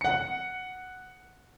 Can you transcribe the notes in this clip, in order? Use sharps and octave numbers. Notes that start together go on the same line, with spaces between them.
F#5 C#7